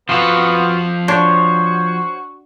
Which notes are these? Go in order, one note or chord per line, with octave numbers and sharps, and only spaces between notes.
F3 B3 F4 F#4 A4
D4 F#4 C5 C#5